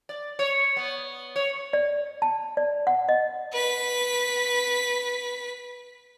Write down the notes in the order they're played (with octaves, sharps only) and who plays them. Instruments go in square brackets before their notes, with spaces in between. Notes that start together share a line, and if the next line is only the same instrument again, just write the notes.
[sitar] D5
C#5
B3
C#5
[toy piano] D5
A5
D5
F#5
D#5
[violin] B4 B6